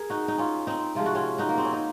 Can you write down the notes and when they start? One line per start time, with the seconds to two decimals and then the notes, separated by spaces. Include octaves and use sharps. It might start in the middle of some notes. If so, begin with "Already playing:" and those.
Already playing: G#4 A#4
0.10 D#4 F#4
0.28 D#4
0.38 C#4 F4
0.67 C4 D#4
0.95 C3 F3 G#3 F4
1.06 F#4
1.15 C#4 F4
1.38 D#4 F#4
1.49 A#3
1.58 C4
1.65 C#4
1.73 D#4